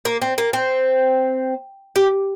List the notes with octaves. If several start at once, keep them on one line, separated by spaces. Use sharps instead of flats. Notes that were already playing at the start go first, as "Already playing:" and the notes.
A#3
C4
A#3
C4
G4